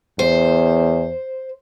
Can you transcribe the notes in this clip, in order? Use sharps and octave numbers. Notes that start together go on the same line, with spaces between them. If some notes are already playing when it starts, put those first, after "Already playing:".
E2 C5